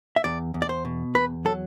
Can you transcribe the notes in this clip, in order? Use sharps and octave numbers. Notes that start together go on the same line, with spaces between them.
E5
E2 D5
E2
D5
C5
B2
E2 B4
F#3 A4